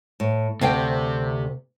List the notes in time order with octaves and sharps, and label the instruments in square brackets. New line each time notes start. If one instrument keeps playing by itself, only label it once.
[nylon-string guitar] A2
[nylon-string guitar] D2 F5 G5 [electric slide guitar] C3